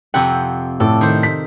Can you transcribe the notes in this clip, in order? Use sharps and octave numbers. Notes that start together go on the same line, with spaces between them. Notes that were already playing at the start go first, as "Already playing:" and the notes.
F2 C3 F#5 G5
A2 A4 D5
D#3 C5
B6